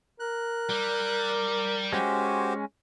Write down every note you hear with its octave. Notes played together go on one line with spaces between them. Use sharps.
A#4 F#6
G3
G#3 C#4 F#4 G4 C5